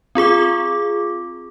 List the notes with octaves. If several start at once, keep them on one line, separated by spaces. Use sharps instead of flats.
C4 F4 G#4 D6